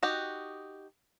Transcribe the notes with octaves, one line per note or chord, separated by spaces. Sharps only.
D#4 F#4 G4